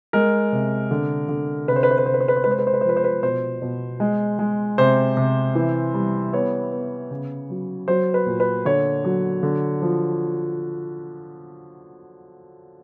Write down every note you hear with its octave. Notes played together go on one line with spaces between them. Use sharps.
G#3 A#4
C3
D3
D3
C3 B4
C5
B4
C5
B4
C3 C5
B4
C5
B4
C5
G#3 B4
C5
B4
C5
B4
C5
F3 B4
C5
B4
B2 C5
B2
G#3
G#3
C3 C5
C3
E3
G3
B3 C#5
B3
C#3
F#3
F#3 C5
B4
A#2
B4
D3 C#5
F#3
D3
F3